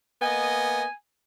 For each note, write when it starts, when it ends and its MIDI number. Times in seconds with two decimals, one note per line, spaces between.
0.22 0.84 58
0.22 0.84 59
0.22 0.84 75
0.22 0.92 80